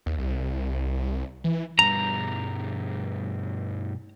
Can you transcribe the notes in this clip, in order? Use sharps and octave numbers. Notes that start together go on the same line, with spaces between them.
D#2
C2
E3
G2 B2 G3 A#5